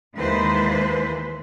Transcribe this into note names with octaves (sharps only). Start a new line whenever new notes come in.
D#2 E3 G#3 B4 C5